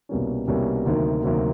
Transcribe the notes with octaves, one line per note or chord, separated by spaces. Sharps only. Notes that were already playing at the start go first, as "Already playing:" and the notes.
C2 B2 G3 A#3 C#4
C2 B2 G3 A#3 C#4
D2 C3 D#3 F#3 A#3
D2 C3 D#3 F#3 A#3